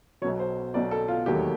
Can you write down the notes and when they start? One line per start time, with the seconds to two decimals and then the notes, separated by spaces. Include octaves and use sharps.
0.22 B1 B2 F#3 C#5
0.40 C5
0.74 B1 B2 F#3 D5
0.91 A4
1.08 F4
1.26 E1 D#2 D#3 F#3 A3 G4